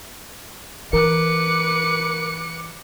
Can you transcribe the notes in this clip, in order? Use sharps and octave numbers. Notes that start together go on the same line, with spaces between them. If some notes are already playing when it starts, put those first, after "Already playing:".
E3 A#4 B4 D6 C#7